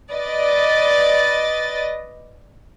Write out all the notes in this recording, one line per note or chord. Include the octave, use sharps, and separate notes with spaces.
B4 D5 D#5 A6